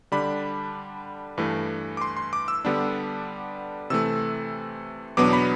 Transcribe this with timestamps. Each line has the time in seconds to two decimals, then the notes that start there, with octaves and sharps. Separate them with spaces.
0.12 D3 G3 D4 B5
1.38 G2 E3 A3
1.97 D6
2.01 C6
2.17 C6
2.33 D6
2.48 E6
2.65 D3 G3 B3 D4
3.90 C3 E3 A3 E6
5.17 E2 B2 F#3 B3 D4 D6
5.33 B5